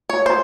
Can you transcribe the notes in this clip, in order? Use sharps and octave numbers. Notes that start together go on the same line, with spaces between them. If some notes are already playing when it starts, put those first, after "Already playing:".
C#5
C5